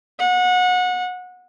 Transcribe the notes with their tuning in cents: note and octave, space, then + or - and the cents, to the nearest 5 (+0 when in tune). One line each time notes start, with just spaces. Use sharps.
F#5 -25